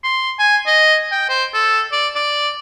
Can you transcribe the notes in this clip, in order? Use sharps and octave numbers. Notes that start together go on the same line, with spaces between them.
C6
G#5
D#5
G5
C5
A4
D5
D5